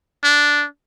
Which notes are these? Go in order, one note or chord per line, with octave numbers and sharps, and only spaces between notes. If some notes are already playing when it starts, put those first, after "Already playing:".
D4